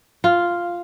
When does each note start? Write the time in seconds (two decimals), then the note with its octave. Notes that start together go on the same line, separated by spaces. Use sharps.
0.24 F4